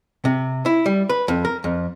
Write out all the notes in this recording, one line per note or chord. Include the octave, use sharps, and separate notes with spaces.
C3
E4
G3
B4
F2
A#4
F2